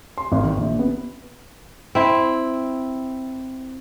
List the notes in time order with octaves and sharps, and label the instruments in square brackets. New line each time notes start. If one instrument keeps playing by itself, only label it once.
[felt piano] C6
G#1
D#3
A#1
B3
[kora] C4 E4